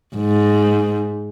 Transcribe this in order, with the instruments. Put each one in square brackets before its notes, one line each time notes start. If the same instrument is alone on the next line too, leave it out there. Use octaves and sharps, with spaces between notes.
[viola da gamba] G#2